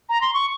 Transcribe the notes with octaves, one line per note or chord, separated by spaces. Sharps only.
A#5
C6
C#6